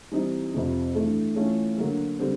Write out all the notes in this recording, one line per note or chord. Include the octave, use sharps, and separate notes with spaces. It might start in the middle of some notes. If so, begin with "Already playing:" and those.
E3 G3 C4 D#4
F2 C3 F3
G2 E3 A3
E3 A3 C#4 F4 A4
D3 F#3 A#3
D3 G3 C4